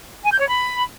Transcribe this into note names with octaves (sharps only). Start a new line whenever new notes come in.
G#5
G6
C#5
B5